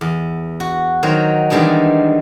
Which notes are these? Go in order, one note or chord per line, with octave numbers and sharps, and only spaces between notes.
E2
F#4
D#3 F#3 C5
D#3 E3 G3 G#3 B3 D4